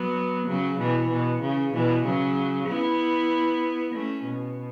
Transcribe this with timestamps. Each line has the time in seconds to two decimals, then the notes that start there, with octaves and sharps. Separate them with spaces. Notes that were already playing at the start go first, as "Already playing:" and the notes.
Already playing: F#3 B3
0.47 C#3 F#3
0.79 B2 E3
1.10 B2
1.41 C#3
1.73 B2 E3
2.05 C#3 F#3
2.68 B3 E4
3.94 A3 C#4
4.26 B2